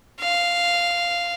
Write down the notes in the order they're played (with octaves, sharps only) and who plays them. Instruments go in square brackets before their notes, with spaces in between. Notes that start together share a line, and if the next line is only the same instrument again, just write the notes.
[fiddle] F5